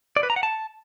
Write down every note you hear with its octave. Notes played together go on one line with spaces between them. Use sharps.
D5
B4
A#5
F#5
A5